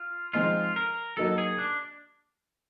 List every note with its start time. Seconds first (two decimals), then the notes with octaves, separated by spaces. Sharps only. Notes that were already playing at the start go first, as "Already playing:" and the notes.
Already playing: F4
0.33 F3 G#3 C4 D#4 F4
0.76 A#4
1.17 F#3 A#3 D#4 F#4 A4
1.38 G#4
1.58 D4